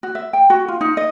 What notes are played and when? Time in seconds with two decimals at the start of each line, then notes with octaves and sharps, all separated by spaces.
0.03 F#4
0.15 E5
0.33 G5
0.50 F#4
0.68 F4
0.81 D#4
0.97 D#5